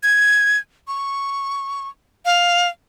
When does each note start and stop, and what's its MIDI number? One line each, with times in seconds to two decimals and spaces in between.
0.03 0.58 92
0.88 1.89 85
2.25 2.68 77